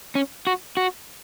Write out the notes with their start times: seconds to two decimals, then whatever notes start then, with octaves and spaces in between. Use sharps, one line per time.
0.15 C#4
0.47 F#4
0.77 F#4